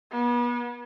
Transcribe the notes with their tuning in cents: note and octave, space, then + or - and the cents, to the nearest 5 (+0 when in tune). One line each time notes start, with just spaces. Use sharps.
B3 -35